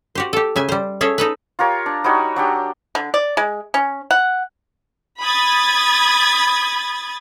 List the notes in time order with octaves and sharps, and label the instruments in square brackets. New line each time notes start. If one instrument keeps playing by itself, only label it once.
[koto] F#4 G4 C5
G4 A4
C#3 E5 G#5
G3 C5
C#4 G#4 A4 C#5 E5
D#4 A4 B4
[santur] F4 G4 A#4 C#5
D4
G3 D#4 F#4 C#5
F#3 D4 G4
[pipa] D3
D5
G#3
C#4
F#5
[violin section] B5 D#6 G#6 A6